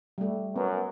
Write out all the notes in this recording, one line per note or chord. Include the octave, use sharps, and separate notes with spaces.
G3 A3
F#2 B3